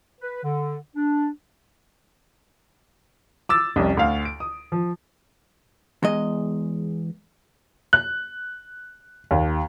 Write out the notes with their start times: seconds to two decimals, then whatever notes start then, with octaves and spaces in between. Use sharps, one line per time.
0.20 B4
0.43 D3
0.95 D4
3.49 D6 E6 A6
3.76 C2 F2 C#4
3.97 D2 F5
4.25 D7
4.40 D#6
4.72 F3
6.03 E2 G#3 D#5
7.93 F#6
9.31 D#2